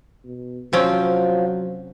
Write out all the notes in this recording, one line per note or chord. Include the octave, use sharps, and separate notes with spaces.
B2
C3 F3 F#3 C4 C#4